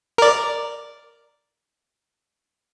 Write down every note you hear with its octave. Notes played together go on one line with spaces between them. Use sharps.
A#4 D5